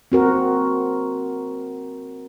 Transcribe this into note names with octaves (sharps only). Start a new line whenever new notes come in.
C4 F#4 A#4